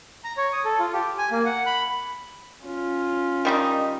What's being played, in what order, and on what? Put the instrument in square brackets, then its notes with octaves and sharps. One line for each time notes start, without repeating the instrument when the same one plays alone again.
[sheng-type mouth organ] A#5
C#5
D#6
A4
F4
G4
G#5
A#3
F#5
B5
[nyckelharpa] C#4 F4
[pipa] D#3 G3 D#4